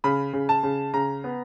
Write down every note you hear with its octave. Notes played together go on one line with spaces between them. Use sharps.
C#3 B5
C#3
A5
C#3
C#3 A#5
B3